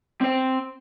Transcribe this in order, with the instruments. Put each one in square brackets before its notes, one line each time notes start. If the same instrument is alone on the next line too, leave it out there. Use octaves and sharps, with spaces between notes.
[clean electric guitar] C4 C5